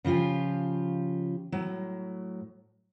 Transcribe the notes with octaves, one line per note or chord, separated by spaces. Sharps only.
C#3 F3 F4 G4 G#5
A2 F#3